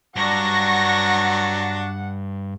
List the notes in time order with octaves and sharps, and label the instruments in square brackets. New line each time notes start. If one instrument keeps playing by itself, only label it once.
[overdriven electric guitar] G2 [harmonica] F#3 D4 [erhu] F#5 [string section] C#6 A#6